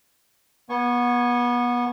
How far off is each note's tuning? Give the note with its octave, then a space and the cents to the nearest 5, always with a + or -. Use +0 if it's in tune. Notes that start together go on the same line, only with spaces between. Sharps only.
B3 -25 G#5 +0 C#6 -15